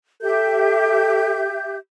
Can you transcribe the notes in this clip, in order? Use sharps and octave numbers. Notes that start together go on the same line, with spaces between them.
G4 A4 E5 G6